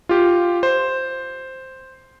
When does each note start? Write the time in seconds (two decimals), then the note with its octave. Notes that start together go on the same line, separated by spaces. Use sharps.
0.09 F4 G4
0.63 C5